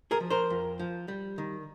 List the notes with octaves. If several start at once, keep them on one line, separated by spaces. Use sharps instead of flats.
G#4 A#4
F3
A#4 C5
F2
F3
G3
D#3